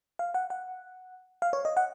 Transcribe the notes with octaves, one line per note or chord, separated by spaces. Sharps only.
F5
F#5
F#5
F5
C#5
D#5
F#5